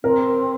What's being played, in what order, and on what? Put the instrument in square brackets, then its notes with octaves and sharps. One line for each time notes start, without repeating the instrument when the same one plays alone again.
[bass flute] C4 [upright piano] A#4